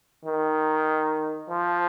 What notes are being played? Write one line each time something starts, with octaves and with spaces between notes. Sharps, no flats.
D#3
F3